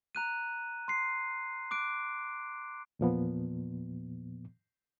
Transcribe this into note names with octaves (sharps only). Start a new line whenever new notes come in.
A#5 F#6 D#7
C6 C7
D6 F#6 D7
E2 A#2 F3 B3